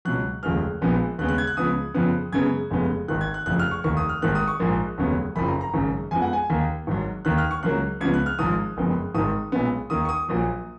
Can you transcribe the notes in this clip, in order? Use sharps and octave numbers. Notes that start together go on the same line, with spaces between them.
C#2 B2 F#3 F#6
F1 D#2 C#3 F3 G#3 F6
A#1 A#2 F3 G#3 B3
D#2 C#3 G#3 B3 F#6
F#6
G#6
F#6
C#2 C#3 F3 B3 D#6
F2 C#3 F3 B3 F#6
F#2 C#3 G#3 B3 G#6
F1 F2 C#3 G#3 B3
G#1 G#2 D#3 F#6
G#6
F#6
F1 F2 C#3 F3 F#6
F6
C#6
F1 D#2 D#3 C#6
D#6
F6
G#1 G#2 D#3 A#3 F#6
D#6
C#6
A#1 G#2 F3 A#3
F1 D#2 C#3 F#3 B3
F#1 F2 C#3 F3 B5
A#5
A#5
G#1 F#2 C#3
F2 F3 G#3 B3 G#5
F#5
G#5
D#2 D#3 A#3
G#1 G#2 F#3
D#2 D#3 A#3 F#6
F6
C#6
C#2 C#3 F#3 A#3 F#6
C#2 C#3 F3 B3 G#6
F#6
F6
G#1 G#2 F3 G#3 D#6
F#1 F2 F3 G#3 B3
G#1 G#2 D#3 D#6
B1 A#2 G#3 B3
D#2 D#3 A#3 D#6
C#6
D#6
A#1 A#2 F#3